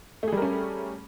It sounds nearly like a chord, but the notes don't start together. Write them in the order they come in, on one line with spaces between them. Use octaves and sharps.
A3 G#4 G3 A#4 C#4